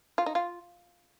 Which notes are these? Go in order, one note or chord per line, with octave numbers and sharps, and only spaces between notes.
F4
D#4
F4